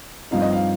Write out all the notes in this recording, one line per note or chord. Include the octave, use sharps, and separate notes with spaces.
G2 F3 C4 D#4 F5
D#5
F5